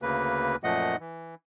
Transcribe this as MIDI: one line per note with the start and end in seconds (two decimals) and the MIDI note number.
0.02 0.56 38
0.02 0.56 49
0.02 0.56 58
0.02 0.56 71
0.64 0.96 42
0.64 0.96 46
0.64 0.96 53
0.64 0.96 57
0.64 0.96 75
0.64 0.96 78
1.00 1.35 52